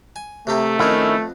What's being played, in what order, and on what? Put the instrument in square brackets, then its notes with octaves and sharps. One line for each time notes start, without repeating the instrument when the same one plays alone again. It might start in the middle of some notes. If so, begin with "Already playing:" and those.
[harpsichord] G#5
[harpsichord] C3 A#3 G4 [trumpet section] A3
[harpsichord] F2 B3 F4 [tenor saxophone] D#3 [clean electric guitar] C#4 E4